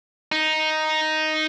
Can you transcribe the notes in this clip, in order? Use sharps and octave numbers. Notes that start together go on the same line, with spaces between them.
D#4